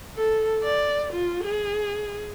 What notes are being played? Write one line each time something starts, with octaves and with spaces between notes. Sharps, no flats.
A4
D5
F4
G#4